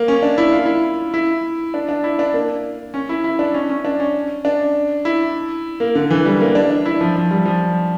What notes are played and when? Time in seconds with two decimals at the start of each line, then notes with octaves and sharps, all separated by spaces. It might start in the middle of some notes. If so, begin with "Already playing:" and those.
Already playing: A#3
0.08 C#4
0.23 D4
0.38 E4
0.52 F4
0.65 E4
1.14 E4
1.74 D4
1.89 D4
2.04 E4
2.19 D4
2.34 A#3
2.94 C#4
3.09 E4
3.24 E4
3.39 D4
3.54 C#4
3.69 C#4
3.85 D4
4.00 C#4
4.45 D4
5.05 E4
5.80 A#3
5.95 D3
6.10 E3
6.25 G3
6.40 A#3
6.55 D4
6.71 D4
6.86 E4
7.01 F3
7.16 F3
7.31 G3
7.46 F3